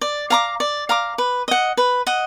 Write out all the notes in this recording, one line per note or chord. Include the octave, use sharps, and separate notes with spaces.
D5
F5 A#5 D6
D5
F5 A#5 D6
B4
D#5 F#5
B4
D#5 F#5